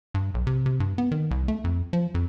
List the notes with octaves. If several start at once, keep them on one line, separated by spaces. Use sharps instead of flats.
G2
B1
C3
C3
G2
B3
D#3
C2
A3
F2
F3
F2